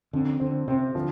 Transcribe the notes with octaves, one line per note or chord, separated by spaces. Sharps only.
F2 D3
D3 C4
C3 C4
D3 F3